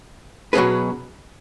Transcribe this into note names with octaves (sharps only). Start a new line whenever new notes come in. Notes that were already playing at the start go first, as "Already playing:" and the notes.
B2 F#3 C#4 G#4 B4